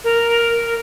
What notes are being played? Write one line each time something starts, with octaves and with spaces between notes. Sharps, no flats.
A#4